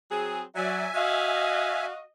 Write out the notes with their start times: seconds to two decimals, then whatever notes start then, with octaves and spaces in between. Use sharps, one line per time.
0.10 F#3 C4 G#4
0.56 F#3 D5 E5 G#5
0.95 F#4 D#5 F5